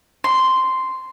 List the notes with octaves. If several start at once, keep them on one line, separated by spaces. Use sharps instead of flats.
C6